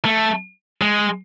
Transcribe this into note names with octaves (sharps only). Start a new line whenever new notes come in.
A3
G#3